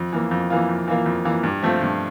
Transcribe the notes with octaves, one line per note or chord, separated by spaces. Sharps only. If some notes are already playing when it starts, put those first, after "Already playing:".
Already playing: F2
E3 A#3 F4
F2
E3 A#3 F4
F2
E3 A#3 F4
F2
E3 A#3 F4
G2
F3 A3 C4 F4
G2